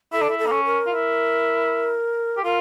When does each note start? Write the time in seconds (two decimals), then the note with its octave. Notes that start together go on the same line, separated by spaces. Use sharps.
0.12 E4 A4
0.21 D4
0.29 E4
0.39 A4
0.46 A#3
0.52 C#4
0.65 A#4
0.86 F4
0.90 E4
2.37 G4
2.44 F4 A#4